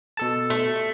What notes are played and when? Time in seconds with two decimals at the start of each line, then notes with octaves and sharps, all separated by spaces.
0.17 B2 A4 A5
0.50 A3